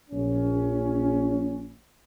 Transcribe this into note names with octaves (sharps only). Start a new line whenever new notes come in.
A#1 C#4